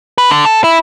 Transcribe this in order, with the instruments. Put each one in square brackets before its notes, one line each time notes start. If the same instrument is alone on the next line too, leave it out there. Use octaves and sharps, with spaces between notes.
[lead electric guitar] B4
D3
A4
E4